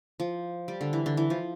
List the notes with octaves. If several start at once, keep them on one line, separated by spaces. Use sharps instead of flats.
F3
G3
D3
E3
D3
E3
F3